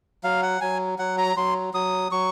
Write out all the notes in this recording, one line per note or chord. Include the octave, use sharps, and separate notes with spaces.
F#3 F5
F#5
F#3 G#5
F#3 F#5
A#5
F#3 C6
F#3 D#6
F#3 C#6